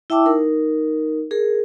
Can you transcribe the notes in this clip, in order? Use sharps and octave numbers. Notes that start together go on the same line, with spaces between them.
E4 E5 G5 A5 D6 E6
D#4 A#4
G#4 A#4